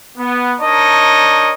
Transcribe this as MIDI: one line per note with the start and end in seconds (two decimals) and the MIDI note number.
0.18 0.54 59
0.60 1.52 62
0.60 1.52 63
0.60 1.52 70
0.60 1.52 73
0.60 1.52 75
0.60 1.52 81